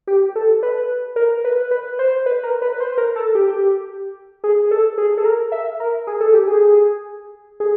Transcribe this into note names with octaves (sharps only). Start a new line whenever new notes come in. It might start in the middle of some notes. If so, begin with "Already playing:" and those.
G4
A4
B4
A#4
B4
B4
C5
B4
A#4
B4
B4
C5
A#4
A4
G4
G#4
A4
G#4
A4
A#4
E5
A#4
G#4
A4
G4
G#4
G#4